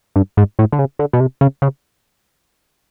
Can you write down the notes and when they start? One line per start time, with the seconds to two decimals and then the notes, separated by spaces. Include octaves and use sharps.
0.16 G2
0.37 G#2
0.59 A2
0.72 D3
0.79 C#3
0.99 D3
1.13 B2
1.20 C3
1.41 C#3
1.62 C#3